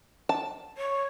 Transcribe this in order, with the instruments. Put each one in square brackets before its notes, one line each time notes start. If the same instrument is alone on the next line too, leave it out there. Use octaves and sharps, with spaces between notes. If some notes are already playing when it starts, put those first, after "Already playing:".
[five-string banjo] A5
[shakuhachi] C#5